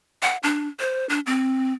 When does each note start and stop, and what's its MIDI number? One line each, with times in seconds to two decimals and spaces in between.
0.22 0.37 78
0.43 0.68 62
0.80 1.08 72
1.09 1.20 62
1.26 1.73 60